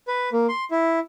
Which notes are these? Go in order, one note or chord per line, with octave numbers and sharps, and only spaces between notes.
B4
A#3
C6
E4